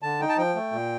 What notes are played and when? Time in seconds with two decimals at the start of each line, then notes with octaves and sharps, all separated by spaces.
0.02 D3 A5
0.21 D#4 G5
0.29 A5
0.37 F3 G5
0.55 A3
0.72 A#2